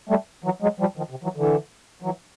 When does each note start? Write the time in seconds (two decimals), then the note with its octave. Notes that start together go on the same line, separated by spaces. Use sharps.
0.09 G3 A3
0.44 E3 F#3
0.62 F#3 G#3
0.80 F3 G3
0.97 D#3 F3
1.10 C3
1.23 E3 F#3
1.36 D3 E3
2.02 E3 F#3